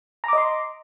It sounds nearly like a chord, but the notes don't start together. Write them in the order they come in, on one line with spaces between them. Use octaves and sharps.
A#5 D6 D#5 C6